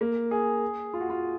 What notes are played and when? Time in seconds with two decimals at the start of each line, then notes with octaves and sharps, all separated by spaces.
0.01 A#3
0.31 G#4
0.94 F4
1.00 F#4
1.10 F4